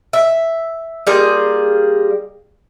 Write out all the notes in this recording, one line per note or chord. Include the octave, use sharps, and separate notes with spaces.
E5
G3 A#3 F4 G#4